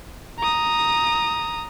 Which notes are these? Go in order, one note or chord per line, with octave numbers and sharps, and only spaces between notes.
A#5 D#6